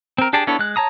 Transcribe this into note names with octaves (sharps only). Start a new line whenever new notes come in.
C4 A#4
D4 G4 G#4 D5 A5
B3 D4 E4 A4 C#5
G#3 F#6
C#5 A5 A#5 D#6